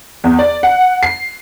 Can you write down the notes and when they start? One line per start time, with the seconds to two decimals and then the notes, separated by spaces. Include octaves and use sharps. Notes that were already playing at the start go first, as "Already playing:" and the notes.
0.24 E2
0.39 D5
0.63 F#5
1.03 C7